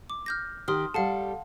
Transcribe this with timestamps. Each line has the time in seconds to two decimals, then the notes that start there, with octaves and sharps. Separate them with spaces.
0.10 D6
0.26 F6 G6 A#6
0.68 D#3 G4 C6 D#6 F6
0.94 G3 A4 F5 F#5 A5